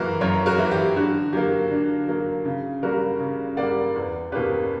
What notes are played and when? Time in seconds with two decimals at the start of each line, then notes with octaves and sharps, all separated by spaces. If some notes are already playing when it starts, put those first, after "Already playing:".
Already playing: F#2 E3 A#3 E4 F#4 A#4
0.21 F#2 A#4 C#5
0.46 F#4 A#4
0.58 E3 A#3 E4
0.71 G4
0.96 D3 F#4
1.33 F#3 A#3 G4
1.70 D3
2.07 F#3 A#3
2.45 C#3
2.83 G3 A#3 F#4 A#4
3.20 C#3
3.57 G3 A#3 D5 F#5
3.96 E2
4.32 B2 A#3 C#4 G4 B4